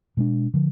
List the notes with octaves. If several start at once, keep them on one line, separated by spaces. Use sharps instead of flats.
B2 G#3 D4
D3 F3